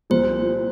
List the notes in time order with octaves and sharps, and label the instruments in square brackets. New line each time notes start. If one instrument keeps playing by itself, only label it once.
[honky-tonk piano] C2 A#2 F3 [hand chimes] C5